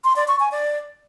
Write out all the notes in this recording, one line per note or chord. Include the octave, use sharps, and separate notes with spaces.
C6
D5
C#6
G#5
D5